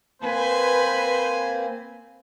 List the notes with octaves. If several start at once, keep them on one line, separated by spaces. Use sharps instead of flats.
A#3 C4 B4 C5 G#5